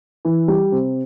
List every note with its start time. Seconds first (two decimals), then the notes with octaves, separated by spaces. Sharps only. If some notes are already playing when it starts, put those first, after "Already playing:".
0.25 E3
0.48 G3
0.72 C3